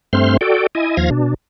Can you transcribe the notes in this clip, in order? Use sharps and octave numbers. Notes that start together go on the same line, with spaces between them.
G2 A3 C4 C5 C6 F6
F#4 A4 D5 G5
E4 D#5 G#5
D#2 F3 F5 G#6 A#6
B2 D4